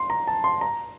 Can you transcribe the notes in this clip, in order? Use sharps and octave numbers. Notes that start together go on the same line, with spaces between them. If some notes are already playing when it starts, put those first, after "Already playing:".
Already playing: C6
A#5
A5
C6
A#5